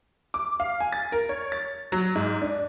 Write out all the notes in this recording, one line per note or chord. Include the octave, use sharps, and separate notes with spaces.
D6
F5
G#5
A6
A#4
C#5
A6
F#3
G#2
D4